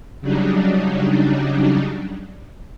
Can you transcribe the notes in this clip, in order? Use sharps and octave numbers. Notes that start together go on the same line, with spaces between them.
C#3 F#3 G3 D4 D#4